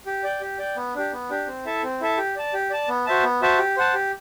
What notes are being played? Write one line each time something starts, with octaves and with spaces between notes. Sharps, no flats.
G4
D5 G5
G4
D5 G5
B3
D4 G4
B3
D4 G4
C4
E4 A4 E5 A5
C4
E4 A4 E5 A5
G4
D5 A5
G4
D5 A5
B3
F#4 C5 E5 A5
B3
F#4 C5 E5 A5
G4
C5 F#5 A5
G4